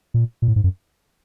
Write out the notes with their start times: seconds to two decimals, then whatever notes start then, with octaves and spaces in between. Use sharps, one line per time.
0.14 A#2
0.42 A#2
0.48 A2
0.56 G#2
0.64 F#2